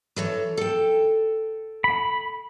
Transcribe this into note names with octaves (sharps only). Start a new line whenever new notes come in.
E3 A4 C#5
A4 G5
B5